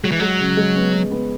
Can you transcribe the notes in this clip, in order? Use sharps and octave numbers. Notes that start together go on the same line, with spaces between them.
F#3 G#3
E3
F#3 G#3
C#3
G#3
B3
B3
B3